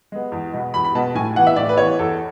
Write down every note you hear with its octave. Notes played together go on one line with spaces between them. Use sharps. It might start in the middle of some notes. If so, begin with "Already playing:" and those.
G#3 B3
E2
B2 G#3 B3
E2 B5
B5
B2 G#3 B3 A5
A2 G#5
E3 B3 F#5
E5
A2 D5
B4
E3 B3 C#5
E2 A4